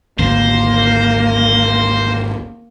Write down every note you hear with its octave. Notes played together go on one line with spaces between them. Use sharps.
G#1 D2 A#3 C5